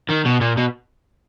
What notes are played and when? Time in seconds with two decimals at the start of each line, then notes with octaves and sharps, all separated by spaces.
0.10 D#3
0.26 B2
0.41 A#2
0.57 B2